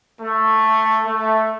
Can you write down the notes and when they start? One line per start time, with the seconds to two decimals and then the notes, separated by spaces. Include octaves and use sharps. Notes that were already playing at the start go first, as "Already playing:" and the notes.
0.22 A3
1.07 A3